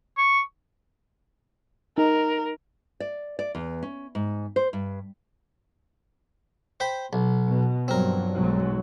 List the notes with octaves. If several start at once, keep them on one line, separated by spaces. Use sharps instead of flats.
C#6
D#4 A#4
D5
D5
E2
C#4
G#2
C5
G2
C5 G5 B5
B1
B2
G2 F3 F#3 C4 A#4
B1 G#2 F#3